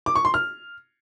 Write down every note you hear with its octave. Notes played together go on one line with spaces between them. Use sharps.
D6
C#6
C6
F6